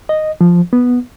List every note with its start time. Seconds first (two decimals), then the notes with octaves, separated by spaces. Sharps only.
0.09 D#5
0.41 F3
0.73 B3